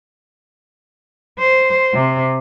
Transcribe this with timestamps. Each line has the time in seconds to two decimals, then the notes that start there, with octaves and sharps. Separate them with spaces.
1.39 C5
1.94 C3